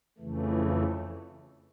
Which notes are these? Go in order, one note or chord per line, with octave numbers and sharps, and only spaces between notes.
F2 C#3 E3 A3